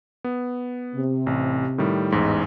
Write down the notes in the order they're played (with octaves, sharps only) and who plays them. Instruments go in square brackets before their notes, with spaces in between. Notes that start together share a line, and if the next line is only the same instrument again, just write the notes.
[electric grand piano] B3
[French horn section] C3
[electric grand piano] A1
A2 D#3 G3
A1 E2 G#2